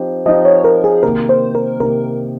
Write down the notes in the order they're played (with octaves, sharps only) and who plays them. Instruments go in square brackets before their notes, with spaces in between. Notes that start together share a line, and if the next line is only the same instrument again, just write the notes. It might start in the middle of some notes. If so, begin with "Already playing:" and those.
Already playing: [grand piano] F3 C4 D#4 G4
[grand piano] F3 C4 D#4 G4 [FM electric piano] D#5
[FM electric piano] C#5
A#4
G#4
[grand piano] C3 D#3 A#3 [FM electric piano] A#4
[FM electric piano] C5
A#4
[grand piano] C3 D#3 A#3 [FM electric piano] A#4